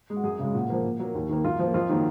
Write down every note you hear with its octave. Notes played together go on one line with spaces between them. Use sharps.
G#3
F#4
F#2 G#4
C#3 G#3
A#2 F#4
F3 A#3
A#2
F#3 A#3
D#2
D#3 A#3
F#2 F4
F3 A#3
F2 F4
D#3 F#3 A#3